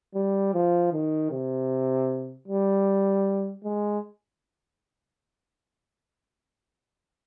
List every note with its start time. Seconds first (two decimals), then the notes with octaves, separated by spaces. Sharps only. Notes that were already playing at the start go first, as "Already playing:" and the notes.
0.15 G3
0.54 F3
0.93 D#3
1.31 C3
2.48 G3
3.64 G#3